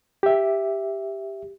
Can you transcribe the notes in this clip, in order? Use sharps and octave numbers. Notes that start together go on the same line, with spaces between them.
G4 E5